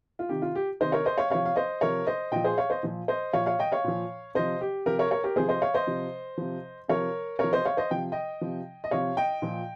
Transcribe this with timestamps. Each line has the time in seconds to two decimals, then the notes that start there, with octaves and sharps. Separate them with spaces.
0.19 F4
0.29 C3 D#3 G4
0.42 F4
0.55 G4
0.80 C3 D#3 C5 D#5
0.92 A#4 C#5
1.05 C5 D#5
1.18 C#5 F5
1.30 C3 F3 C#5 F5
1.45 F5
1.56 C5 D#5
1.81 C3 F3 A#4 C#5
2.07 C5 D#5
2.32 A#2 F3 D#5 G5
2.44 G#4 C5
2.58 C#5 F5
2.70 C5 D#5
2.83 A#2 F3
3.08 C5 D#5
3.33 A#2 F3 C#5 F5
3.46 C#5 F5
3.59 D#5 G5
3.72 C#5 F5
3.84 A#2 F3
4.35 C3 F3 C5 D#5
4.61 G4
4.86 C3 F3 G4 A#4
4.99 A#4 C#5
5.11 A#4 C#5
5.24 G4 A#4
5.36 C3 F3 G#4 C5
5.49 C5 D#5
5.62 C#5 F5
5.74 C5 D#5
5.87 C3 F3
6.38 C3 F3
6.88 C3 F3 A#4 C#5
7.39 C3 F3 A#4 C#5
7.53 C5 D#5
7.65 C#5 F5
7.77 C5 D#5
7.90 C3 F3 G5
8.12 D#5 G5
8.41 C3 F3
8.84 D#5
8.91 C3 F3 C#5 F5
9.17 D#5 G5
9.42 A#2 F3